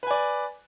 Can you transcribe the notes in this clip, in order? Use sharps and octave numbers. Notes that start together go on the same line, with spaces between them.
B4 D5 G#5